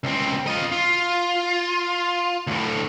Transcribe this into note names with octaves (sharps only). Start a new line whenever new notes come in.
C#2 C4
F4 D#5
F4
D2 A2